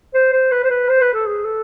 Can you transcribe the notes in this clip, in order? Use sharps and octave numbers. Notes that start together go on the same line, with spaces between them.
C5
C5
B4
C5
B4
C5
B4
A4
G#4
A4